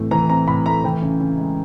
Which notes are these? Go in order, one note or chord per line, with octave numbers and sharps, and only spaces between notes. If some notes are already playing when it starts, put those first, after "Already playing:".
Already playing: A2 E3 A3 C4
E3 A#5
C4 A#5
A2 B5
A3 A#5
E3 G5
C#3
C#3
G#3